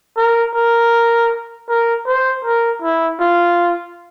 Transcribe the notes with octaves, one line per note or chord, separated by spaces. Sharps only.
A#4
A#4
A#4
C5
A#4
E4
F4